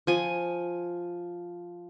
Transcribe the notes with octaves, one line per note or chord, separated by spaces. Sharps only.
F3 G#5